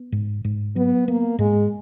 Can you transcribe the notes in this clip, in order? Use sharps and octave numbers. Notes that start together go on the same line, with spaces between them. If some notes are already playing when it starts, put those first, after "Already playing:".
Already playing: B3
G#2
G#2
F#3 B3
A#3 B3
G#2 G#3